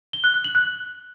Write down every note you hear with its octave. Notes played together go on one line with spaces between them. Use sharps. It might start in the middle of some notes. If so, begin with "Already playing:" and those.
G7
F#6
F#6
F#7
F#6